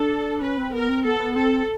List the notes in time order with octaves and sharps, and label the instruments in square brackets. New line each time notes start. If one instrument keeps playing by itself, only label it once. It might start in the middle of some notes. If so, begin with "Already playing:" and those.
Already playing: [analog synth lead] D4 [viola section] A4
[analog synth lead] C#4 [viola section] B4
[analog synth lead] C4
[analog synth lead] B3 [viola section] A#4
[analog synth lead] C4
[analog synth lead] B3 [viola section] A4
[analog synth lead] B3
[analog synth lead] C4 [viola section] A4